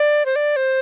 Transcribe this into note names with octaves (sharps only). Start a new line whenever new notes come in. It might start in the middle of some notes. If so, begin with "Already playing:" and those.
Already playing: D5
C5
D5
C5